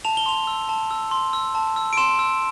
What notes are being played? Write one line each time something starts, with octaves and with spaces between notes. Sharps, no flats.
A5 F7
G7
C6 F7
E6
A5
E6
C6
E6
A5
E6
D7
C6 E7
E6